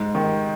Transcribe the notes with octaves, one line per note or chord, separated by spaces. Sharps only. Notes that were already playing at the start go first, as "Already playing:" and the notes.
Already playing: G#2
D#3